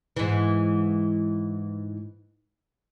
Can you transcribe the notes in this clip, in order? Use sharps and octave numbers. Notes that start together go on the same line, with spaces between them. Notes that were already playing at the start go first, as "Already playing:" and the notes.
G#2 E3